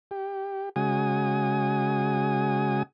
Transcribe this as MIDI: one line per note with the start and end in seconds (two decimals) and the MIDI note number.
0.11 0.69 67
0.76 2.83 49
0.76 2.83 56
0.76 2.83 66
0.76 2.83 80
0.76 2.83 87